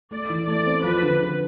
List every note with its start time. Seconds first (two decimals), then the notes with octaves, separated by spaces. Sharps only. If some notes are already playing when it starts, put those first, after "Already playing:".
0.11 A3 D5
0.30 E3
0.47 A3 D5
0.66 C4
0.84 F3 B4
1.02 D3
1.20 D3